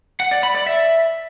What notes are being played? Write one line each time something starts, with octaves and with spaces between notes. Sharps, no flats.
F#5
D5
B5
D5
E5